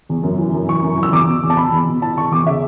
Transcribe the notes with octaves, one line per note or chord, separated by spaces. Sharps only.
E2
F#2
E3
F#2
E3 C#6
F#2
E3
E6
E2 D6
B2
E2
A5
B2 B5
E2
B2
E3 A5
E2 C#6
E2 D6
C#3 E5